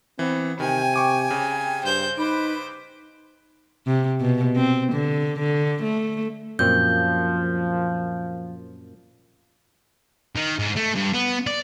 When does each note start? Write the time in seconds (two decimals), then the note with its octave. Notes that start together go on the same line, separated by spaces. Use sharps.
0.19 E3 B3 C4
0.60 C3 D#3 G5 G#5
0.94 C#6 D6 D#7
1.31 C#3 G4
1.85 G2 C5 G6
2.18 D#4 B4 C5 B5 D6
3.87 C3
4.20 B2
4.56 C4
4.93 D3
5.39 D3
5.83 A3
6.59 F#2 A#2 F3 C4 G6
10.36 D#3
10.59 G#2
10.76 A3
10.95 G2
11.14 B3
11.47 D5